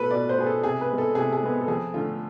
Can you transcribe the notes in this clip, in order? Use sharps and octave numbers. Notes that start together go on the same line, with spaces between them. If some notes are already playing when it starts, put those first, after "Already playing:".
Already playing: B2 B3 A4 B4
B2 D5
C5
B3 G#4
A4
C3 G#4
B4
G#3 B3
A4
C3 G#4
G#4
G#3 B3
A4
F2 G#4
D3 A3 F4